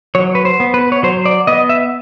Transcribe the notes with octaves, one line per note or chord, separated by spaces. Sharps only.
F#3 C#5
B4
C5
B3
B4
C#5
F#3 C5
D5
B3 D#5
E5